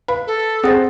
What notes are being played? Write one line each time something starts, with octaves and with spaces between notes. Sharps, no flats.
B4 F5 B5
A4
C4 G#4 C5 F#5 D#6 A6 A#6